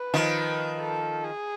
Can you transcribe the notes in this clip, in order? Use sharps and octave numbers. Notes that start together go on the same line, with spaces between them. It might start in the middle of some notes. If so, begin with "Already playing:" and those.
Already playing: B4
D#3 F3
A4
G#4